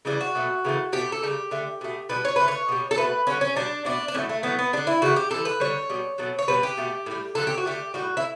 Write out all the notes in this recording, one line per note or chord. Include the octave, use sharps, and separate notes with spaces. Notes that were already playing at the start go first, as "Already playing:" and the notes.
C#3 E3 G3 D4
F#4
B2 F#3 A3
C#3 E3 A3
B2 A3 G4
A4
C#3 G3 G4
D3 A3
B2 A3
B2 G3 B4
C#5
D3 A3 B4
C#5
B2 G3
A4
B2 A3 B4
D3 G3 C#4
C#4
B2 G3 D4
B2 A3 D4
D4
A2 F#3 A3 C#4
A3
A2 F#3 A3 B3
B3
D3 G3 D4
E4
C#3 E3 A3 F#4
G4
C#3 E3 G3 A4
B4
D3 G3 C#5
B2 G3
B2 F#3 A3
C#5
B2 G3 B4
G4
B2 A3
A2 G3
D3 F#3 A3 A4
G4
F#4
D3 A3 G4
A2 G3 F#4
E4